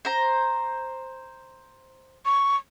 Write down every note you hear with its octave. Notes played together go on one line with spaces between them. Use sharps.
C5 A#5
C#6